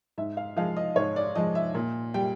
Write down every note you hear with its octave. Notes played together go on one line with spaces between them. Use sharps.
G#2 E5
F5
F3 G#3 F5
D#5
G#2 C#5
D5
F3 G#3 D#5
E5
A#2
G3 G5